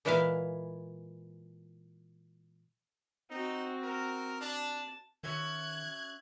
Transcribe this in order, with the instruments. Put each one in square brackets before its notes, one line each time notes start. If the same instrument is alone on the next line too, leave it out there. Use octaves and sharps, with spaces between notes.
[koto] A#2 E3 G#3 E4 E5 F5
[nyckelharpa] C4 F#4 [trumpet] D#4
[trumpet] A#4
[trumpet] D4 [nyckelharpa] A5
[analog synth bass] D#3 [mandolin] C#4 F#4 E5 [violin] F#6 G#6